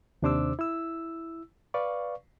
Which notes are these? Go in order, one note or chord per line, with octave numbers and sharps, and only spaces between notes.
D#2 C3 D4 C5 D6 E6
E4 E6
B4 D5 F5 C#6